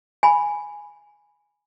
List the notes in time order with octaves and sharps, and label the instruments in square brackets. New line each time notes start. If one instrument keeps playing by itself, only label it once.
[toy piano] G#5 B5